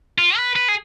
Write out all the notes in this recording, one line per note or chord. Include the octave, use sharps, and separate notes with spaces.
F4
B4
B4
G#4